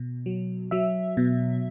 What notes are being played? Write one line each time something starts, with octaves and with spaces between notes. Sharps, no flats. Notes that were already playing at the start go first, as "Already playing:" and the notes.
Already playing: B2
F#3
F#3 E5
B2